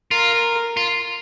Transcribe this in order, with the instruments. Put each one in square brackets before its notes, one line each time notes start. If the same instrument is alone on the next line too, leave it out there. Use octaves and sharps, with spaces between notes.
[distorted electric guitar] F4 [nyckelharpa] A#4
[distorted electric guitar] F4